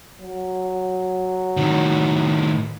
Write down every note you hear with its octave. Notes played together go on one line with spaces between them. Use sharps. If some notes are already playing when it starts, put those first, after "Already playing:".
F#3
A2 D#3